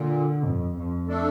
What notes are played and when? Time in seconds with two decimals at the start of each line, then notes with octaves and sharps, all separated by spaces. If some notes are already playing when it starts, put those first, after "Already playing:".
Already playing: A#2 D3
0.45 F2
0.76 F2
1.08 A3 D4 A4